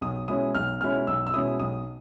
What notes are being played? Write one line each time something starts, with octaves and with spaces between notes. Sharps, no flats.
B1 D#6
B2 G#3 C#4 E4 D#6
B1 F6
B2 G#3 C#4 E4 F6
B1 E6
E6
B2 G#3 C#4 E4 D#6
B1 D#6